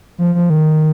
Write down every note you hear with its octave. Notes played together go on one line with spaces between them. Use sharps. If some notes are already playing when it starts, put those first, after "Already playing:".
F3
F3
D#3